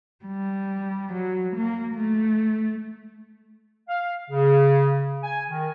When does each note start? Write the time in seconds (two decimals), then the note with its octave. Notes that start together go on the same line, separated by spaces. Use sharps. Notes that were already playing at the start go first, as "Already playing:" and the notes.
0.25 G3
1.13 F#3
1.57 A#3
1.95 A3
3.89 F5
4.31 C#3
5.24 G#5
5.50 D#3